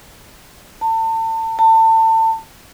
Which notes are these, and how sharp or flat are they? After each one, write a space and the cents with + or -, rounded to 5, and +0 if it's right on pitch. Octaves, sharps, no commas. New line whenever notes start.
A5 +35
A5 +30